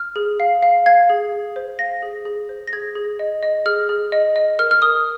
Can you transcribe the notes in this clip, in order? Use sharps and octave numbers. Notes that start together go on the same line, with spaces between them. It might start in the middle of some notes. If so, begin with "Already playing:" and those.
Already playing: F6
G#4
F5
F5
F5 G#6
G#4
G#4
C5
F5 A#6
G#4
G#4
C5
A#6
G#4 G#6
G#4
D#5
D#5
G#4 F6
G#4
D#5
D#5
A#4 F6
F6
A#4 D#6